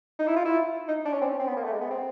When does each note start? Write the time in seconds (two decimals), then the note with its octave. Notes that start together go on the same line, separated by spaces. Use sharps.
0.19 D#4
0.27 E4
0.36 F4
0.45 E4
0.88 D#4
1.05 D4
1.13 C#4
1.21 C4
1.30 C#4
1.39 C4
1.47 B3
1.56 A#3
1.64 A3
1.72 G#3
1.81 B3
1.91 C4